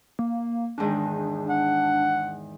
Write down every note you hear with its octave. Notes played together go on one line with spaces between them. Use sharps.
A#3
E2 G#2 D#3 D4
F#5